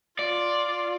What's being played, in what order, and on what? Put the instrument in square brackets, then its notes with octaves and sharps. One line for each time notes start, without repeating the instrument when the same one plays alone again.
[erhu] F4 [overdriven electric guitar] D5